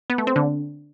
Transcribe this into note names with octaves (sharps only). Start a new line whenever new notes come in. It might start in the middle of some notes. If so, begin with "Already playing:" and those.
B3
A3
C4
D3